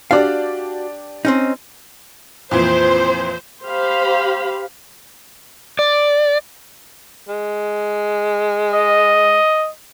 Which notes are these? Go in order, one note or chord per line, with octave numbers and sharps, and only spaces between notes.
D4 F#4 G4 D5 F5
C4 C#4 D#4
F2 A#2 E3 C5
G4 C5 F5 B5
D5
G#3
D#5